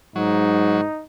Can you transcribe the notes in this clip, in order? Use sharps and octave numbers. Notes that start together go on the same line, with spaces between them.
G#2 F#3 D#4